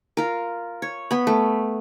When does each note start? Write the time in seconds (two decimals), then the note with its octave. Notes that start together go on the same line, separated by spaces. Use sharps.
0.17 F4 A#4
0.82 C#5
1.11 B3 B5
1.27 A3